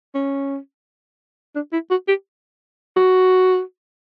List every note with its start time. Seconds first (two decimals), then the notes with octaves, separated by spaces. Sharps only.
0.14 C#4
1.55 D4
1.72 E4
1.90 F#4
2.08 G4
2.96 F#4